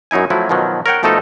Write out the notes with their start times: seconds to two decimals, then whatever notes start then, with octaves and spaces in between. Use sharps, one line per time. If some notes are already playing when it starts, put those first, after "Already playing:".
0.11 F#2 F#3 D#4 E4 G#5
0.30 F3 F#3 A3 E4
0.49 B2 D#3 F3 F#3
0.86 A#4 C#5 F#5 G5
1.03 B2 F3 A3 D#4 A4